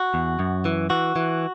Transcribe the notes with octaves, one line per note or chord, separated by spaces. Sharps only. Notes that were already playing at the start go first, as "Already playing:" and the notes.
Already playing: F#4
E2
F#2
E3
E3 F#4
E3